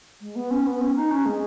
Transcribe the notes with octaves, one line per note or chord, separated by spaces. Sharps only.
G#3
B3
C#4
B3
C#4
D#4
C#4
G#3